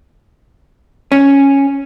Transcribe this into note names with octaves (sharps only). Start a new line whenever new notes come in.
C#4